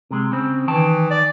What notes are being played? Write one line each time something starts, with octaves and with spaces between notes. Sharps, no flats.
C3 G#3
C#3 C4
D#3 E3 G5 A5
D5